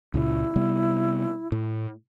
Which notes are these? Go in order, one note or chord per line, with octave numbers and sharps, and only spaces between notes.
C#2 A#2 C#3 E4
C3 G3 B3
A2